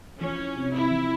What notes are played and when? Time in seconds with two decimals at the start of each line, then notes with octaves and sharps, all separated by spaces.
0.21 F3 C#4
0.38 E4
0.56 C3
0.73 C4 E4
0.90 F3